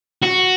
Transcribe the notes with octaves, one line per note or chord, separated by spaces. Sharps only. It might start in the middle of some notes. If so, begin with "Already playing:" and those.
F#4